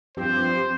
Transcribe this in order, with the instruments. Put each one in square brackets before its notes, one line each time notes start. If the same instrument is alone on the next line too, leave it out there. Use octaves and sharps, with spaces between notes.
[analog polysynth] G2 F3 C4 G4 [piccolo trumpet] C5